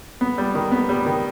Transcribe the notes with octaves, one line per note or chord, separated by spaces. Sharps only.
B3
G3
D#3
B3
G3
D#3